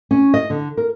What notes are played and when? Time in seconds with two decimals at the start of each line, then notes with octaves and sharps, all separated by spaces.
0.11 C#4
0.34 D#5
0.50 D3
0.77 A#4